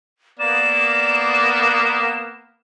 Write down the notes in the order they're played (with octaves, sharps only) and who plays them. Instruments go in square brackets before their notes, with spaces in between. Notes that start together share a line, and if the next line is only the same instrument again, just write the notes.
[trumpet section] A#3 B3 [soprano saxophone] D5 [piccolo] E7